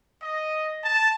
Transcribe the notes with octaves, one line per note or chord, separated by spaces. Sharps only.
D#5
A5